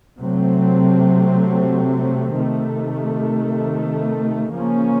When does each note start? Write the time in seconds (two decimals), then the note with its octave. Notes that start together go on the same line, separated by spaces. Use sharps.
0.20 C3 F#3 A3 C4
2.37 C3 D#3 A3
4.53 C#3 F3 A#3 C#4